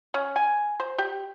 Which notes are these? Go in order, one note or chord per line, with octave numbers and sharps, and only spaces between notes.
C#4
G#5
C5
G4